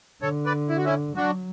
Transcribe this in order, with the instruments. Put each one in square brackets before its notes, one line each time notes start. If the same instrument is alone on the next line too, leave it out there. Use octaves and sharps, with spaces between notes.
[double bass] D3 [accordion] A4 C#5
[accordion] B4 D5
E4
F#4
C#4 E4
[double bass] F#3 [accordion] D4 F#4